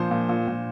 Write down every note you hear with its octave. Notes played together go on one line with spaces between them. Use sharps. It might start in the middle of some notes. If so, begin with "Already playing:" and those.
Already playing: A#2 F3 C5
A#2
A#2
A#2